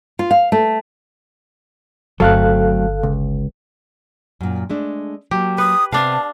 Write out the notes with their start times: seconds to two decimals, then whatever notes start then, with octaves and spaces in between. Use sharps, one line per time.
0.19 F4
0.31 F5
0.52 A3
2.20 G1 C#3 F#3 A3 C4 A4 F5 F#6
3.03 C#2
4.41 F#2 A#2
4.70 G#3 A3 D4
5.31 F#3 A#3 G4
5.58 B4 D#6
5.92 C3 B3 D4 B4 F5 A5